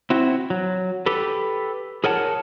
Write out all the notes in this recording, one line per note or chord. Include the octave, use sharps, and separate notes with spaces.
C4 E4 F#4
F#3
G4 A4 B4
G#4 A#4 C#5 F#5 G#5 A5